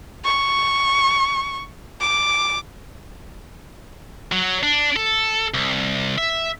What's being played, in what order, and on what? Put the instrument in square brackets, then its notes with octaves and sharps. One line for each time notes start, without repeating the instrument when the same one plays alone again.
[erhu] C#6
D6
[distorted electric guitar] F#3
D4
A4
C2
E5